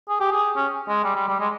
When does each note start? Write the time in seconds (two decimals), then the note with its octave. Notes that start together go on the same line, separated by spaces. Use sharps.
0.09 G#4
0.20 G4
0.32 G#4
0.56 C#4
0.88 G#3
1.04 G3
1.16 G3
1.28 G3
1.40 G#3